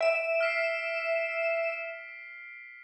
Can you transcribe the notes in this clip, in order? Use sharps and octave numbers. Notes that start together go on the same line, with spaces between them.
E5 D7 E7
F6 B6 C7